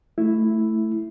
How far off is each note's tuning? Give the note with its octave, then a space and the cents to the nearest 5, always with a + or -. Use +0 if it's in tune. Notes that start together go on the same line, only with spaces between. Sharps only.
A3 +0 E4 +0